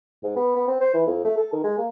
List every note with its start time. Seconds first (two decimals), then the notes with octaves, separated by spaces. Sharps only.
0.23 G#2
0.36 B3
0.56 B3
0.68 C4
0.81 C5
0.94 E3
1.07 F2
1.24 A3
1.38 A4
1.53 D#3
1.64 G#3
1.78 A#3